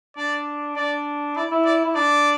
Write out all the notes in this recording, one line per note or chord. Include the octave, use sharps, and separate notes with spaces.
D4 D5
D4 D5
E4 D5
E4
D5
E4
D4 D5